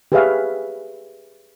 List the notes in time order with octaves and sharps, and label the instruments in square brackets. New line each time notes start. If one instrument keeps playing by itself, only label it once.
[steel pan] G4 G#4 B4 C#5 E5 F5